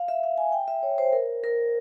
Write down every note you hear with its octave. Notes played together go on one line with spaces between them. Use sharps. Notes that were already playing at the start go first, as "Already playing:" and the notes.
Already playing: F5
E5
F5
G#5
G5
E5
C#5
C5
A#4
A#4